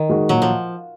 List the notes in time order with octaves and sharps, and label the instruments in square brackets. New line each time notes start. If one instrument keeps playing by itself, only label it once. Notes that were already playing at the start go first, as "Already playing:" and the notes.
Already playing: [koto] D#3
[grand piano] G#3 D#4 F#4 A#4
[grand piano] A#2 [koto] F#3
[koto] F3